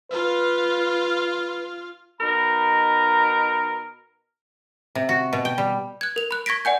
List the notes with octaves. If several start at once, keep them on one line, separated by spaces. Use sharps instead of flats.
F4 B4 F5
B2 D#4 A#4 A#5 B5
C3
F#4
B2
G5
G3
F#6 G#6
A#4 F7
B5 F#6
C#6 G#6 A#6 B6 D7
D5 F#5 G#5 G6